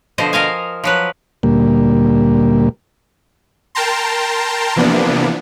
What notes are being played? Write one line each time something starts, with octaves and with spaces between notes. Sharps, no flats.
B2 D3 F3 C5 D#5
A#4 D#5 F5 G#5
F3 F#3 B4
D2 A#2 G3 A#3
A#4 G5 A5 A#5 C6
C3 E3 F3 A#3 B3 D4